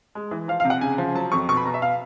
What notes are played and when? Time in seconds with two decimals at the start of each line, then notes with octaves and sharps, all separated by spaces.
0.15 G#3
0.31 E3
0.48 F3 F5
0.60 F5
0.65 C3
0.70 F#5
0.81 C#3 G#5
0.98 F3
1.15 F#3 A5
1.32 F2 C#6
1.49 B2 C#6
1.57 B5
1.65 B2 A#5
1.74 E5
1.82 F5